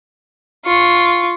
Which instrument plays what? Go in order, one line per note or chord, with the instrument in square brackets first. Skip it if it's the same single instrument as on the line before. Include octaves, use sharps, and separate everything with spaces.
[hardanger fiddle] F4 C#6